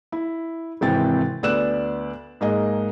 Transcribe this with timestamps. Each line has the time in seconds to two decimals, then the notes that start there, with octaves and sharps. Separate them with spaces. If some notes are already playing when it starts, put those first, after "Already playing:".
0.12 E4
0.81 G#1 C3 E3 C4 G5 A6
1.43 D2 B3 D5 E6 F#6 E7
2.41 G#2 A#3 G#4 D#5